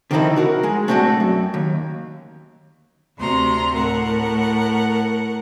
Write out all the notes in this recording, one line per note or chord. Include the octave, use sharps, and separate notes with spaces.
D3 D#3 F3 C4 D#4 E4
F#4 A#4 F#5
G#3 G#4
A3 B3 C4 D4 F#4 A4
F#2
D#2
D2 C3 A#5 C6
A2 A#4 F#5